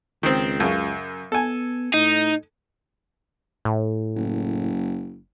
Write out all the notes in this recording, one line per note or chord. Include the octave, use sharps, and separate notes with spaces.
C#2 D#3 C4
F#2 C#3
B3 A4 G#5
A2 D#4
A2
F#1